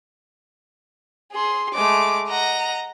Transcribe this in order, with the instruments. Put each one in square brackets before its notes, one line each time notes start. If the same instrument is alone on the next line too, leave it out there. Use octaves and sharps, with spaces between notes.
[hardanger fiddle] G#4 C6
[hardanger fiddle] G#3 A3 [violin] D6
[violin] D#5 A#5 [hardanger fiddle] F#5